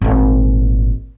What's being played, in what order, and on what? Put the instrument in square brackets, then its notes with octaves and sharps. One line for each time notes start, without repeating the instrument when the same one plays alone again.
[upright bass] G#1 A#2